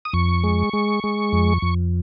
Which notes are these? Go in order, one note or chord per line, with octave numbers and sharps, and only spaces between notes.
D#6
F2 C#6
G#3
G#3
G#3
F2
F2